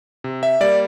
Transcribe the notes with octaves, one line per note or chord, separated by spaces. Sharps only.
C3
E5
G3 A#3 D5